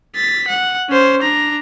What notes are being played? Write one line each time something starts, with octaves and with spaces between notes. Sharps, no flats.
A6 B6
F#5
C#4 C5
D4 A#5